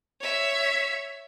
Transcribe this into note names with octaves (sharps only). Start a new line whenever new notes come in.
C#5 E5